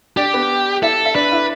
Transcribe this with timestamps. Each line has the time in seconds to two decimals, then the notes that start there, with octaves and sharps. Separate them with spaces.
0.17 D4 G4 D5
0.33 B3 B4
0.82 E4 A4 E5
1.05 E5
1.14 D4 B4 D5
1.32 E4 E5